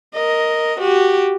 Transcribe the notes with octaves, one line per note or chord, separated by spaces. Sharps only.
A#4 D#5
F#4 G4